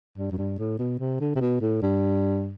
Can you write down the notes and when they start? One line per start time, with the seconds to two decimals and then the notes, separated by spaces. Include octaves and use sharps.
0.18 G2
0.32 F#2
0.38 G2
0.59 A2
0.79 B2
1.00 C3
1.20 D3
1.36 C3
1.41 B2
1.61 A2
1.82 G2